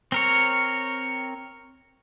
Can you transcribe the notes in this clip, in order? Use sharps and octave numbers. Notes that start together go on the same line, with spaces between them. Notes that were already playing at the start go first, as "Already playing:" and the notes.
C4 A#4 C#5